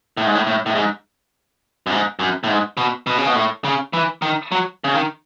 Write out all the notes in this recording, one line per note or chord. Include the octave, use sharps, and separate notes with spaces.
A2
G#2
A2
A2
A2
G#2
F#2
G#2
F#2
A2
G#2
B2
B2
C#3
B2
A2
C#3
E3
D#3
F#3
C#3
D#3